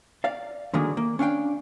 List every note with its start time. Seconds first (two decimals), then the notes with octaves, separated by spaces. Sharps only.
0.24 D5 F5
0.74 D3 D#3 F#3 A#3 G#4
0.97 A#3
1.19 C#4 D4 F5 G5